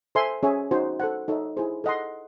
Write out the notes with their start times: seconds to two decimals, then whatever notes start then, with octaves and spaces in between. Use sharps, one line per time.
0.15 A4 C5 E5 G#5 C6
0.43 C#4 G#4 C#5 E5 G#5
0.71 D#4 F#4 C5
1.00 A4 C5 F#5
1.28 D#4 A4 C#5 E5
1.57 E4 G#4 C5
1.84 A4 D#5 F#5 C6